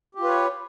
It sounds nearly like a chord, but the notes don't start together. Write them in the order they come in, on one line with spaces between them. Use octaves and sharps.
G4 F4 B4 C#5